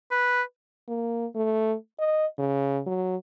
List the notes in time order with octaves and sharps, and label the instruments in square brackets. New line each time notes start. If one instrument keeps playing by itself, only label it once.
[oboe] B4
[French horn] A#3
A3
D#5
C#3
F#3